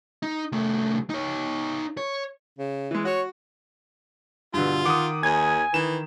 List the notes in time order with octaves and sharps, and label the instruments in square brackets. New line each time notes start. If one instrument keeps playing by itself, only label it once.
[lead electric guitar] D#4
C2 A3
D#4 C#5
C#5
[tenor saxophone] C#3
[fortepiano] E3 G#3
[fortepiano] F#4 [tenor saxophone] C#5
[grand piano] G2 B2 D3 [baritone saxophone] F4
[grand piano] D#3 F#5 [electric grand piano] D6 D#6
[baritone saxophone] D#2 [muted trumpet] G#5 [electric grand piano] G#6
[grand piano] D#3 [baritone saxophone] E3 [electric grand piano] E7